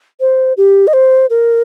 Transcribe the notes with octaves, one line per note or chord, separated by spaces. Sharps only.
C5
G4
D#5
C5
A#4